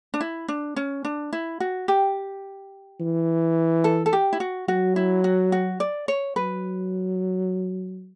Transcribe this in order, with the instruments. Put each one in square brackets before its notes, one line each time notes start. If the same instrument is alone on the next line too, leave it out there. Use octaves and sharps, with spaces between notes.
[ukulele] D4
E4
D4
C#4
D4
E4
F#4
G4
[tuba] E3
[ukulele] A4
A4
G4
E4
F#4
[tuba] F#3 [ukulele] F#4
[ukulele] E4
F#4
F#4
D5
C#5
[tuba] F#3 [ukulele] B4